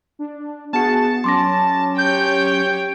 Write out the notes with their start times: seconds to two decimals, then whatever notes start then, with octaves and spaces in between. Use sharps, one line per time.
0.19 D4
0.73 B3 F#4 G#4 A5 C#7
1.24 F#3 C#4 C6 D6 A#6
1.98 G4 C#5 G5 G6